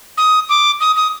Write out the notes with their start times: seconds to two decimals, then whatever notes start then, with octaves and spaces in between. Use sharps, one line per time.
0.18 D#6
0.49 D6
0.80 D#6
0.96 D#6